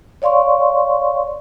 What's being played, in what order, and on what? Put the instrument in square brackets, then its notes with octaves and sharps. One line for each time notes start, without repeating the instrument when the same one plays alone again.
[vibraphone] C#5 D5 F5 C6 C#6